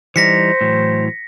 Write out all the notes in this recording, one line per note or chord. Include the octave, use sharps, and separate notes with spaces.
E3 G3 D#4 C5 A#6 B6 C#7
A2 E3 F#3